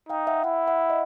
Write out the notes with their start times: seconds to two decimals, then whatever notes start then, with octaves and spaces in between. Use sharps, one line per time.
0.09 D#4 F5 G5
0.27 E5 F#5
0.44 E4 E5 F#5
0.67 E5 F#5
0.90 D#5